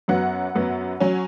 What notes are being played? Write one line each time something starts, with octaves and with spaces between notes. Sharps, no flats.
F#2 F#3 B3 F#5
F#2 F#3 B3
F#3 C#4